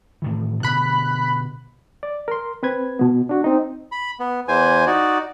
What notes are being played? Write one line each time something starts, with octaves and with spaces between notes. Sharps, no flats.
A2 D#3 E3
B2 D3 B5 F#6
D5
A#4 C6
C4 B4 G#6
B2 B3
D4 F#4
C4 D#4
B5
B3
E2 E3 C5 G#5
D#4 F#4 D5